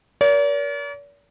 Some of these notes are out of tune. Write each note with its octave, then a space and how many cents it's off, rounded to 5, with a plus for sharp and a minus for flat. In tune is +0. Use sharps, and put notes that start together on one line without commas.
A#4 +20 D5 -45